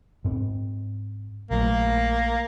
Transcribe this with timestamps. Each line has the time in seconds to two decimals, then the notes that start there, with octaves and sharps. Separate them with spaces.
0.24 G#2 C4
1.51 A#1 F#3 A3 A#3